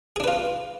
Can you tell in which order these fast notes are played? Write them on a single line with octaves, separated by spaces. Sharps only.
G#4 D4 B4 F4